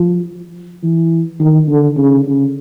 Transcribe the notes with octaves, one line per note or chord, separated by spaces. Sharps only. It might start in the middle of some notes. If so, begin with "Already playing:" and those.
Already playing: F3
E3
D#3
D3
C#3
C#3